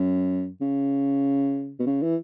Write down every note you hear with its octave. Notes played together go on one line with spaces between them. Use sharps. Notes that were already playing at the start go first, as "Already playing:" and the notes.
Already playing: F#2
C#3
B2
C#3
E3